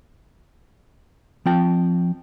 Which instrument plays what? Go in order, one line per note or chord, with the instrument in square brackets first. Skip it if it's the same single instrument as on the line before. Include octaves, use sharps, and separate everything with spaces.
[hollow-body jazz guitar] F3 C4 G5 A5